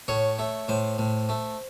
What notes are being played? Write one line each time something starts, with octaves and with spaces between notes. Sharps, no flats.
A2 C#5
A3
A2 C5
A2
A3